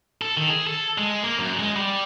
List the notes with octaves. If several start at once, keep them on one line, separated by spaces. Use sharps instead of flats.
A4
D#3
G#4
A4
G#3
A#3
F#2
G#3
G3